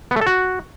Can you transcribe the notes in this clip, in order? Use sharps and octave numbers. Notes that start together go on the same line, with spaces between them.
B3
A3
A4
F#4